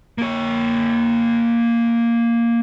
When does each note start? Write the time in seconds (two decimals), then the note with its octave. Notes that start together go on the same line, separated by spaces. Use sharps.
0.18 A#3 C#5